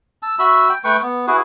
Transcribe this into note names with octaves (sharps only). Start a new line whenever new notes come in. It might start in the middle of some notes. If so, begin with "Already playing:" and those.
A5 E6
F#4 E5 B5 E6
G5
A3 B4 G5 C#6
B3
E4 F#4 G#4 B4